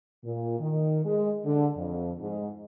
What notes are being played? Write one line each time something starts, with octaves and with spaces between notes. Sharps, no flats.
A#2
D#3
G#3
D3
F2
G#2